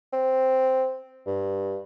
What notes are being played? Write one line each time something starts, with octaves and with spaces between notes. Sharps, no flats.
C4
G2